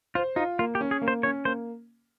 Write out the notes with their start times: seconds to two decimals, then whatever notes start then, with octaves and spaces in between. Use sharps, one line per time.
0.15 F4 C5
0.36 D#4 F4
0.59 A#3 F4
0.75 G4
0.81 C#4
0.91 G#4
1.02 A#3
1.08 C5
1.23 C#4 C#5
1.45 A#3 C5